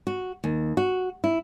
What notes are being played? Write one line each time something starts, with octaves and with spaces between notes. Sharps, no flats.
F#4
D#2
F#4
E4